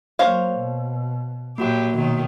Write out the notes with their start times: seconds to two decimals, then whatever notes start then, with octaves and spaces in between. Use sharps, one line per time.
0.19 F#3 A#3 C5 C#5 F5
0.59 B2
1.58 A#2 F#3 A#3 F#4 G4 F#5
1.94 B2 D#3 F#3